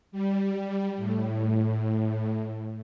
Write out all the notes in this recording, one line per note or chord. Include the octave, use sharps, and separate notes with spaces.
G3
A2